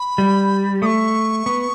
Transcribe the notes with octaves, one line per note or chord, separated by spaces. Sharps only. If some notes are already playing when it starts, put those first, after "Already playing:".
Already playing: B5
G3
A3 C#6 D#6
B3